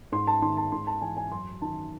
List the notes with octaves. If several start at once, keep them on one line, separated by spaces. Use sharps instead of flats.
G#2 C6
A5
D#3 C6
A5
G#2 C6
A5
E3 G#5
G#5
F#2 C6
D#3 A5